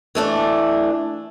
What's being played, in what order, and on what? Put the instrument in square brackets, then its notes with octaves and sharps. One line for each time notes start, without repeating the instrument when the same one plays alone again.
[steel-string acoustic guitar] E3 A3 D4